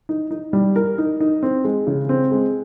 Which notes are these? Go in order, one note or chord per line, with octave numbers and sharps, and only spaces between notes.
D#4
D#4
G3
A#4
D#4
D#4
C4
G#3
C#3
C4
G#3